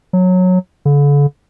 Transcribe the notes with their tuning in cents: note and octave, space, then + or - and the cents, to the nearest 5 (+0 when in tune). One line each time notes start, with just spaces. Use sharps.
F#3 -15
D3 -40